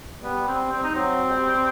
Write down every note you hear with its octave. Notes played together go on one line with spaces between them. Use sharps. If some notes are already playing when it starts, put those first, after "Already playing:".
G3 B3
C4
C4
D#4
F#3 C4
G3